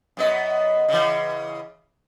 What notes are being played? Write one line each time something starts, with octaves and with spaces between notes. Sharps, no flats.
F#2 B3 D#5
C#3 E3